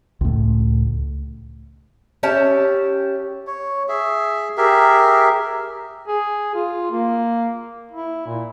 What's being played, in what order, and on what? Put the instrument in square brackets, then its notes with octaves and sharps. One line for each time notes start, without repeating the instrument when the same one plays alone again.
[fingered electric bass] C#2 A2
[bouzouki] C#4 G4 E5 A5
[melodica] C#5
G#4 E5
G4 G#4 A#4 E5
[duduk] G#4
F4
A#3
E4
A#2